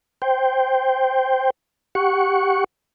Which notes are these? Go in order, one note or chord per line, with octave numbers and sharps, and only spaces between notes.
C5 G5
G4 F#5 C#6